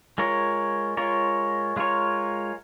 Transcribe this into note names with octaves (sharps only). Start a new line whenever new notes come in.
G#3 F4 A#4 C#5
G#3 F4 A#4 C#5
G#3 F4 A#4 C#5